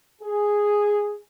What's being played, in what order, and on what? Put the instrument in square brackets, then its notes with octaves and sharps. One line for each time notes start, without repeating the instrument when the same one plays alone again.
[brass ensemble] G#4